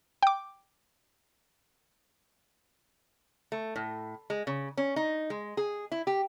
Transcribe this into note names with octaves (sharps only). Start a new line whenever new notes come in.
G5 D6
A3
A2
G#3
C#3
C#4
D#4
G#3
G#4
E4
G4